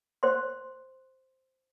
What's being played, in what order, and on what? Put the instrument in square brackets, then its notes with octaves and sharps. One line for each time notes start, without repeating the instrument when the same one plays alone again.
[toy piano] C5 C6